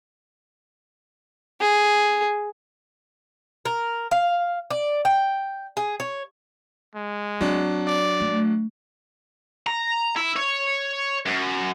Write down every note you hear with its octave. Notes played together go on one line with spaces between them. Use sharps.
G#4
A#4
F5
D5
G5
G#4
C#5
G#3
F#3 C4 D4
D5
A3
A#5
E4
C#5
F#2